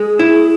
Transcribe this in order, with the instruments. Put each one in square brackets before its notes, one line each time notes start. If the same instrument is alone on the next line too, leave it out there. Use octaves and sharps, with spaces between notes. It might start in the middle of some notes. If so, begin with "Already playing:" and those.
Already playing: [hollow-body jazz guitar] G#3 [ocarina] G#4
[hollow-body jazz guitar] E4